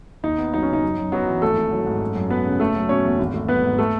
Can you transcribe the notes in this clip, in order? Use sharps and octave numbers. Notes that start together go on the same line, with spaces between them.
D#2 D#4
B3
F#3 D#4
C#4
C#3
D#4
F#2
F#2
F#3 B3 F#4
E3
G#1 A3 A4
G#1
F#3
G#2
F#2
F#2
F#3 B3 B4
C#3
F#1 A3 A4
F#3
B2 C#4 C#5
E2
G#1
A3
F#3 B3 B4
G#2
A3 A4